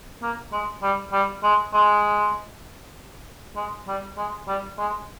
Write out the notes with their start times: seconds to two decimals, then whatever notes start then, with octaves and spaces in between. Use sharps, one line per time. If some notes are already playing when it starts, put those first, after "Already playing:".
0.22 A#3
0.52 G#3
0.83 G3
1.12 G3
1.43 G#3
1.73 G#3
3.56 G#3
3.87 G3
4.17 G#3
4.48 G3
4.79 G#3